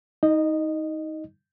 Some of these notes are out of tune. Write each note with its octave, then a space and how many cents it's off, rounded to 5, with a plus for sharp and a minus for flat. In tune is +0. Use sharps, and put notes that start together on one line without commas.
D#4 +25 D#5 -15